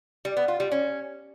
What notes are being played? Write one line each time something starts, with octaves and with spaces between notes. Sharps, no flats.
G3
B3
F4
G3
C#4